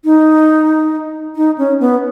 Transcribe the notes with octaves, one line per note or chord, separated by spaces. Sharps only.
D#4
D#4
C#4
B3